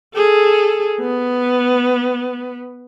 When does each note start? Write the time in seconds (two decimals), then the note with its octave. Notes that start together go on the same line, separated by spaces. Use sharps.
0.15 G#4 A4
1.01 B3